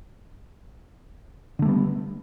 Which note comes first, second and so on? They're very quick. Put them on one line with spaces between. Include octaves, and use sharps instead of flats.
D3 A3 G3 B3